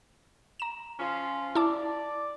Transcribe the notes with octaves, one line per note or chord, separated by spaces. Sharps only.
A#5 E7
F3 C#4 F4
E4 D5 A5 D6